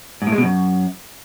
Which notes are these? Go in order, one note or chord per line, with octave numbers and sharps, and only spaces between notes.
G#2
A2
G#3
B2
F#2